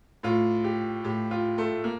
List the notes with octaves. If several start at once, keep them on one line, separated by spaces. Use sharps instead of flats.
A2 F4
G4
A2 G4
F4
A3
A#3